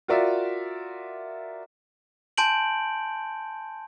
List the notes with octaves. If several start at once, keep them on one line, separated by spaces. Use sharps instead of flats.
F4 F#4 A#4 D5 E5
G#5 A5 C6 G6 D7 F#7